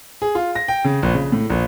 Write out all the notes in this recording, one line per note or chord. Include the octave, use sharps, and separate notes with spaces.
G#4
F4
A#6
G5
C#3
A#1
C#3
A2
A#1